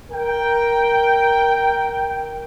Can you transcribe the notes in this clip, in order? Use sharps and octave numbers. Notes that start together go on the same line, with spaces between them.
A#4 G5